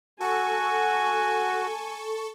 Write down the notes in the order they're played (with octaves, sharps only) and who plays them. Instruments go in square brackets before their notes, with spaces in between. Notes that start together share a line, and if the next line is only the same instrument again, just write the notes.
[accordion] F#4 [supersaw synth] A4 C#6 [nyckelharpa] G#5